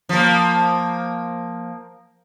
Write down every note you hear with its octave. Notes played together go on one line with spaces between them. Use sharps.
F3 A#3